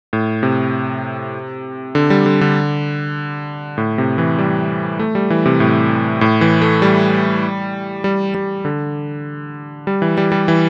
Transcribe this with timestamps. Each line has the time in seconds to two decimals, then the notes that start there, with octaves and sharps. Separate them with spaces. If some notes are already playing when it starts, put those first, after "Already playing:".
0.13 A2
0.43 C3
1.95 D3
2.10 G3
2.26 D3
2.41 D3
3.78 A2
3.98 C3
4.18 E3
4.39 G3
4.99 A3
5.15 G3
5.30 E3
5.46 C3
5.60 A2
6.21 A2
6.41 E3
6.61 A3
6.82 G3
8.04 G3
8.34 G3
8.65 D3
9.87 G3
10.02 E3
10.17 G3
10.32 G3
10.48 E3